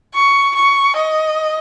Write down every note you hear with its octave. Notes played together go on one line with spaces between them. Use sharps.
C#6
C#6
D#5